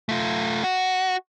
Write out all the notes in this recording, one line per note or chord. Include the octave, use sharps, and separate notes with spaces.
A3 F4
F#4